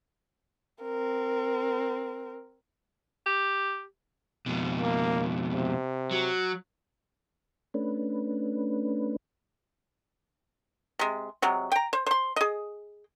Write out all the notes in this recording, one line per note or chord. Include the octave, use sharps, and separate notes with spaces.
C4 A#4
G4
F2 B2
A#3
C3
F#3
A3 C#4 D4 B4
C3 G#3
C3 F#3 G#3
G5 A#5
C5
C5 C6
G#4 D#5